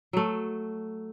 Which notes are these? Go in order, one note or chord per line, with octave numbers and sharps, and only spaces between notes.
F#3 A3